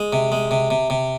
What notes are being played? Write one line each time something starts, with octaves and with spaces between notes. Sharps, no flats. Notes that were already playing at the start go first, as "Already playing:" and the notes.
Already playing: G#3
C3
G#3
C3
C3
C3